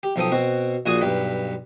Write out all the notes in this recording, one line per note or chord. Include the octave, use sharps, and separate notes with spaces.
G4
B1 F3 A4 G5 D#6
B2 C4 F#4
A#1 A#2 F#4 G#4 G#5 D#6
B1 G2 B4 G5 B5